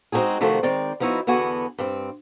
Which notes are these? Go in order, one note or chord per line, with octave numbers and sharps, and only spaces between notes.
G#3 C4 D4 D#4 F#4 G#4
C3 D#3 F3 A3 F#4
D#3 G#3 C4 D5
F3 B3 D#4 E4 F#4
E2 D3 B3 F#4 G#5
G2 C4